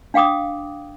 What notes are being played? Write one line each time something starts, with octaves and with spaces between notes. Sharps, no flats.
D4 F5 G5 D6 D#6